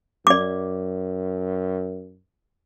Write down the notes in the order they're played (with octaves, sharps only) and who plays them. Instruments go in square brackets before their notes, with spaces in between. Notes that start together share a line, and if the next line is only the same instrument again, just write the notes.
[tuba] F#2 [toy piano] D5 D6